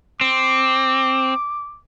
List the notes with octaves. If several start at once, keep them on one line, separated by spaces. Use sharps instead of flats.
C4 D6